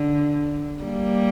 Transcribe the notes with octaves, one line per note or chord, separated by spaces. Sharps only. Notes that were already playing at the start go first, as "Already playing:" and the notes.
Already playing: D3
G3 A#3